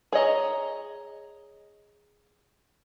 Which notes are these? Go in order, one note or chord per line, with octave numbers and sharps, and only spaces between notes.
G#4 C#5 D#5 A#5